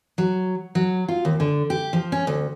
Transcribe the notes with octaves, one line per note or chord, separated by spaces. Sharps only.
F#3
F#3
F4
D#2
D3
G4
F3
C#4
D2